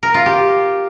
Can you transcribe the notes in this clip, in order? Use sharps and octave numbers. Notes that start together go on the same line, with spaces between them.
A#4
F4
G4